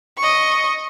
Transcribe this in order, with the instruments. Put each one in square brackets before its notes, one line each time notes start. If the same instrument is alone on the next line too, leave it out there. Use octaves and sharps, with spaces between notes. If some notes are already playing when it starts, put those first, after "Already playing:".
[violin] D#5 C#6